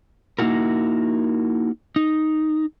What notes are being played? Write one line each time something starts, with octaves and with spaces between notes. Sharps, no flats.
A#3 D#4 E4 F#4 A#4
D#4